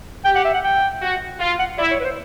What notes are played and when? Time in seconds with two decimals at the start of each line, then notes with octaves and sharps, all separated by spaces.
0.25 G4 G5
0.35 F#5
0.45 E5
0.54 F#5
0.64 G5
1.02 F#4
1.40 F4
1.59 F#5
1.78 E4 D5
1.91 C#5
2.00 B4
2.04 C5